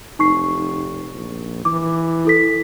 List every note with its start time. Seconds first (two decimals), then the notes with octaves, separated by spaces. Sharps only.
0.19 F1 D#4 C#6 C7
1.15 A#1
1.65 E3 D6
2.25 E4 A4 B6